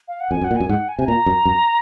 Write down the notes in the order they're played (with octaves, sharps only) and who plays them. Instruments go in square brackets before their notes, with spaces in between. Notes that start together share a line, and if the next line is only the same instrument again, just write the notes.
[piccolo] F5
F#5
[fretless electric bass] F2 [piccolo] G#5
[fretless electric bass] F#2
[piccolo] F#5
[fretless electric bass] A#2
[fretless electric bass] F#2 [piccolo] G#5
[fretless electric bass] G#2 [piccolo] F#5
[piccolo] G#5
[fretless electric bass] C3 [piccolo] G#5
[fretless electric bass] A#2 [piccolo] A#5
[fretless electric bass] F#2
F#2